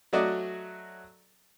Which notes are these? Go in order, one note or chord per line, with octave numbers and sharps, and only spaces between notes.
F#3 A3 F#4 D5 D#5